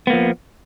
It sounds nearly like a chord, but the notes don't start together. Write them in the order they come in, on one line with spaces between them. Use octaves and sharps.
B3 A#3 F3